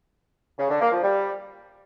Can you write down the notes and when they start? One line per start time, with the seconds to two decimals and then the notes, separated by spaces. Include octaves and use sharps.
0.59 C#3
0.70 D3
0.81 A#3
0.92 F3
1.03 G3